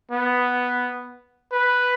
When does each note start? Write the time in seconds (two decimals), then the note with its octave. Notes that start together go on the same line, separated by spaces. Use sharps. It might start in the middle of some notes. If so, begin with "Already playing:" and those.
0.11 B3
1.52 B4